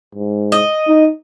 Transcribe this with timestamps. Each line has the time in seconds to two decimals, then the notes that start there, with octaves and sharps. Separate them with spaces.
0.15 G#2
0.52 D#5
0.88 D#4